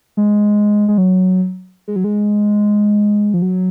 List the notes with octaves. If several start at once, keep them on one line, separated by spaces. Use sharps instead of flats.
G#3
G#3
F#3
G#3
F#3
G#3
F3
F#3